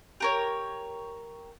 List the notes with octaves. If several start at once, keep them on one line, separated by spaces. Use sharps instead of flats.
G4 A#4 C#5